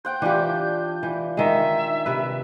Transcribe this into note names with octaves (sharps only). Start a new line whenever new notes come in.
C5 F#5 G5 G6
E3 D4 F4 G4
E3
D#3 G#3 E5
C3 B4